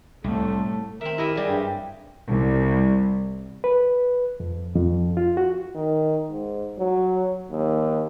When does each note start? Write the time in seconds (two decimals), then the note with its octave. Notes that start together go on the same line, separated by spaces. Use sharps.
0.24 C2 A2 A3
1.01 D#3 C4 A#4 E5
1.18 E4 G4 A#4 D#5 E5
1.35 F#3 G3 G#4 D5
1.47 G2 G5
2.28 C2
3.64 B4
4.40 F2
4.75 F2
5.17 F4
5.37 F#4
5.75 D#3
6.30 G#2
6.78 F#3
7.50 D#2